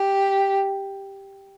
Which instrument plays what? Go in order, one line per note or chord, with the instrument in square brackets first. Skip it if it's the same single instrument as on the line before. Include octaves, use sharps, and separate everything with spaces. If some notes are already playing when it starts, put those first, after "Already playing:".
Already playing: [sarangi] G4